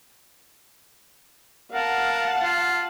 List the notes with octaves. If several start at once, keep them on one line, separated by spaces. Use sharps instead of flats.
A#4 F5 F#5 A5
F4